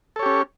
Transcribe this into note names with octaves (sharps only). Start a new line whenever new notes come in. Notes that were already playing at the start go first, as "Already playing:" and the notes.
C#4 G4 A4 C#5